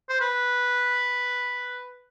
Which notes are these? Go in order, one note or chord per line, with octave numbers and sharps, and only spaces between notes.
C5
B4